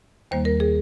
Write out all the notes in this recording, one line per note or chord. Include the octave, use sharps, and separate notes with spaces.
D#2 D#3 G3 A#3 C5
A#4
G#4